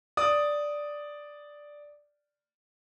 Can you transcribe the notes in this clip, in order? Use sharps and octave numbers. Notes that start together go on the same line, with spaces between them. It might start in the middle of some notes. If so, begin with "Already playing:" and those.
D5 D#6